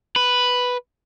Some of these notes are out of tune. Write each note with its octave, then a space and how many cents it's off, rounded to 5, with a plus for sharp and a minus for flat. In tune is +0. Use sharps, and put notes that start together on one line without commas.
B4 +0 B5 +0